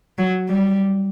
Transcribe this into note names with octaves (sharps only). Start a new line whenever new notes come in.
F#3
G3